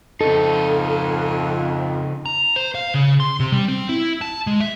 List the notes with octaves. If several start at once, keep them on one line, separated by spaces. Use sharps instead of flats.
F2 C#3 D#4 A4
A#5
C5
F5
C#3
C6
C3
G3
C4
E4
A5
G#3
E5